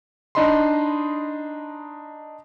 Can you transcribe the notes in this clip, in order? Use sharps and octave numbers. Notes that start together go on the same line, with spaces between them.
D4 D#4 D#5 B5 C6